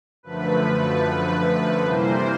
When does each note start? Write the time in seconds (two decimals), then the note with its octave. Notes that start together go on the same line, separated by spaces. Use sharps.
0.23 F#2 D3 F3 A3 B4
1.03 B4
1.83 C3 E3 G3 A#3 C5